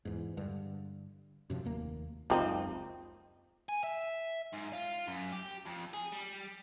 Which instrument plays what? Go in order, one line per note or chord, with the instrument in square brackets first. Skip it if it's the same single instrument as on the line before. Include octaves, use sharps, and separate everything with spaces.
[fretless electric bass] E2 G#2
G2 D3
F#2 C3 F3
F1 D#2 A#3
[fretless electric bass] F#1 C#2 F#2 [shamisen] F3 C4 D#4
[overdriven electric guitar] G#5
E5
G#2
F4
F#2
G4
F2
G#4
G3